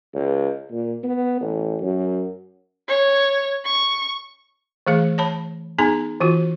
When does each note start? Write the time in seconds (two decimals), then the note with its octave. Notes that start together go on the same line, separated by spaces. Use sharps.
0.14 C#2
0.71 A#2
1.03 B3
1.41 A1
1.81 F#2
2.87 C#5
3.64 C#6
4.87 E3 A3 G#4 F5
5.18 C#5 A5 B5
5.78 B3 D#4 G#4 G#5 A#5
6.20 E3 F4 F#4